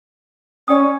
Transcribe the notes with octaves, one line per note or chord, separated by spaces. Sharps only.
C#4 D5 G5 D#6